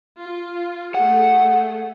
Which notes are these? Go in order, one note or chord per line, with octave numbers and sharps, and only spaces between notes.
F4
A3 G#4 F#5